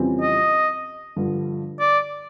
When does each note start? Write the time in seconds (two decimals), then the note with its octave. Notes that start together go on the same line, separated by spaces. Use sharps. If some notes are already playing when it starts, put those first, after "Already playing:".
Already playing: F2 C#3 E3 G3 C4
0.21 D#5
1.16 G2 D3 F3
1.80 D5